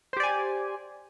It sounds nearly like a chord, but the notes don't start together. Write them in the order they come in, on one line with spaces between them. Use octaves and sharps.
C5 G4 D5 G#5